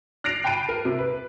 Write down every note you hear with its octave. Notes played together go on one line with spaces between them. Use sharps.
F#6 A6 A#6 C7 D7 F7
G5 A5 B5 D7 D#7
A#4
C3
B4